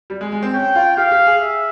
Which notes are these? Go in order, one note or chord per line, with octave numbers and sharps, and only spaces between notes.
G3
G#3
G#3
C4
C#4 G5
F4
G4 F5
G4
G#4
E5